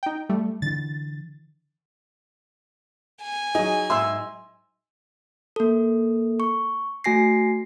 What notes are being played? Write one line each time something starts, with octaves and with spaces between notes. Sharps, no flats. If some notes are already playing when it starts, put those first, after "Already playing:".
D#4 G5
G3 A3
D3 E3 A6
G#5
F#3 D#4 G#4
G#2 E5 C6 E6
A#3 A4
C#6
A3 F#4 G#5 A#6 C7